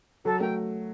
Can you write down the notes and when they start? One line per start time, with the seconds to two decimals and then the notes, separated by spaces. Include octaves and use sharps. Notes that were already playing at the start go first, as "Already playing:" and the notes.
0.25 F#3 A4
0.40 A3 G5